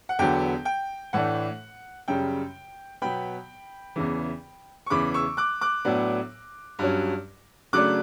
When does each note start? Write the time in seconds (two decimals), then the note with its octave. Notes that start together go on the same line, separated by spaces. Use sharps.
0.09 F#5
0.19 E2 D3 F#3 B3 G5
0.65 G5
1.13 A2 E3 A3 D4 F#5
2.08 F#2 C#3 G3 G5
3.02 B2 F#3 B3 G5 B5
3.96 E2 C#3 E3
4.86 C#6
4.90 E2 C#3 E3 B5 D6
5.14 C#6 E6
5.37 D6 F#6
5.61 D6 F#6
5.85 A2 F#3 B3 D4
6.79 G2 F#3 C#4
7.73 C#3 F#3 A3 D4 D6 F#6